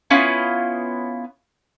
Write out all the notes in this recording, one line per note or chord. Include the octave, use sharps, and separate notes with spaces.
B3 C#4 E4 F4